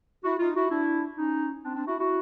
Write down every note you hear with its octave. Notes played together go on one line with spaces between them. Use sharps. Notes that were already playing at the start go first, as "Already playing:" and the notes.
E4 F#4
D#4 F4
E4 F#4
D4 E4
C#4 D#4
C4 D4
C4 D4
E4 F#4
E4 F#4